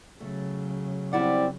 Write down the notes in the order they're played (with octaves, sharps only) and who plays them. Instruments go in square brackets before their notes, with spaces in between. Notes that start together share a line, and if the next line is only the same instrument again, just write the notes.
[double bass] C#3 F#3 [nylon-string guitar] A3
[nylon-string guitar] G3 E4 F#5 [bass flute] C4 [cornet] D5